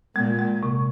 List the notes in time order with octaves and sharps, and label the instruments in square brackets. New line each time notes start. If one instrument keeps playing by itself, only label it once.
[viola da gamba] A#2 [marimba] G#3
[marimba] G#3
C3